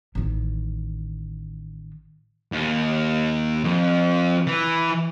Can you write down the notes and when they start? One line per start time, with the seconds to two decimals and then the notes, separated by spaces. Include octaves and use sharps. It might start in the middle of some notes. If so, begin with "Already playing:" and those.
0.15 A1 D#3
2.52 D#2
3.64 F2
4.47 E3